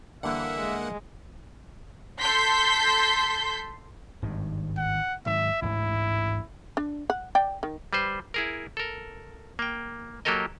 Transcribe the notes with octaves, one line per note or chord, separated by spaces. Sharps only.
D3 E3 G3 A#3 E5 F#5
G#3
A4 C6 G6 B6
G#1 G2 D#3
F#5
G#2 D#3 F#3 E5
A1 D2 G#2 E4
D4
F#5
D5 G5
D#3
G3 B4 C5
E4 G#4 A#4
A4 A#4
A#3 G5
F#3 A#3 G4 A4 A#4 D#5